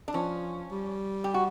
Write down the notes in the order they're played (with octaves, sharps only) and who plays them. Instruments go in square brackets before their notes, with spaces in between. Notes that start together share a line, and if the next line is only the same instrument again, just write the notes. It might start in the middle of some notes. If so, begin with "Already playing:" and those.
[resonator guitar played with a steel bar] D4
[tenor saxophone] F3 [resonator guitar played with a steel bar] C#4
[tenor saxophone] G3
[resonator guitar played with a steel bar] G4
F#4